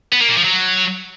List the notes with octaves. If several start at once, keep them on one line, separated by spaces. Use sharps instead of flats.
B3
A#3
A#2
F3
F#3